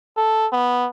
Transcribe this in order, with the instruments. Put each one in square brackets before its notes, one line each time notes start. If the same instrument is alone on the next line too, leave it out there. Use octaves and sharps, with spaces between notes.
[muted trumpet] A4
B3